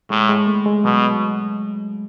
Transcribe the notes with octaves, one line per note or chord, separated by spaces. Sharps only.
A2 G#3
G#3
A3
G#3
B2 F#3